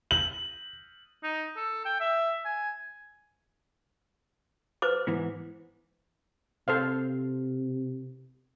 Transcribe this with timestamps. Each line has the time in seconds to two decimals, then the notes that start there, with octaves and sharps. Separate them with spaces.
0.11 F#7
1.23 D#4
1.57 A4
1.85 G5
2.00 E5
2.45 G#5
4.82 B4 C5 D6
5.07 G#2 E3 B3
6.68 C3 A4 C5 F5